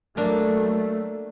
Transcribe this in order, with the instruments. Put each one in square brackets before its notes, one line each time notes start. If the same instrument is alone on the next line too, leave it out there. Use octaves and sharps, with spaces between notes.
[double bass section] F#3 A3 [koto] A#3 D4